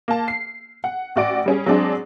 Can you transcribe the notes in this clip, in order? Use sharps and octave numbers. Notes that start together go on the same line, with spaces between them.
A#3 A5
C7
F#5
A1 F#4 D5 D7
G3 C#4 G#4
F#3 G#3 C4 D4 G#4 D5